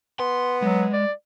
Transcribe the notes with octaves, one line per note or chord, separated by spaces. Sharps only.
B3 C6
F#3 G#3
D5